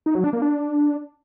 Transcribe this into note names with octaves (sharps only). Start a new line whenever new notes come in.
D#4
F#3
D4
A#3
D4